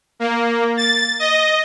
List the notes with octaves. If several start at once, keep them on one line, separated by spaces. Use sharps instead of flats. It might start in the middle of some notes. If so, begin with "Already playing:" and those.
A#3
A6
D#5